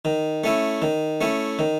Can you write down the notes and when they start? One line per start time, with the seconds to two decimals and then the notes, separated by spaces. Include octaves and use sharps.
0.05 D#3
0.44 A3 C#4 E4
0.82 D#3
1.21 A3 C#4 E4
1.59 D#3